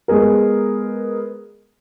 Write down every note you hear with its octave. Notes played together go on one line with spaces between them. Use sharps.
G#3 B3 G#4 A#4